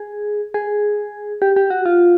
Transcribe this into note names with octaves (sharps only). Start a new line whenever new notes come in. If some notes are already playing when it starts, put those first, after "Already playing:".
Already playing: G#4
G#4
G4
G4
F#4
F4